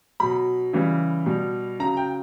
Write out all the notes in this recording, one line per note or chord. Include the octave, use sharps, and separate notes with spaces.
B2 F#3 B5
C#3 E3 G3
B2 G3
C#3 F#3 A#5
G5